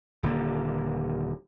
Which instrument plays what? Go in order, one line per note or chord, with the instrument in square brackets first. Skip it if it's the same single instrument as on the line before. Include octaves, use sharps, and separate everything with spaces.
[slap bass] D#1 D3 A#3